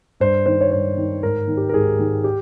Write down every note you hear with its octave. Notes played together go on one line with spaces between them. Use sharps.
G2 C5
D#3 C5
C#5
G2 C5
D#3
G#2 A#4
D#3
G4
A#4
G#2 G#4
D#3
G4